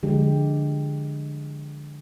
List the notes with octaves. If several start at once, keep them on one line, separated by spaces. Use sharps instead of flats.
D3 F3 G#3 G4